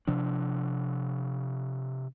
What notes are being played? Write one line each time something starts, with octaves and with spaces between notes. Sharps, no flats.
C3 F3 D4